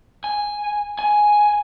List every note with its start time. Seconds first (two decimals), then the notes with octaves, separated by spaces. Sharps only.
0.24 G#5
0.99 G#5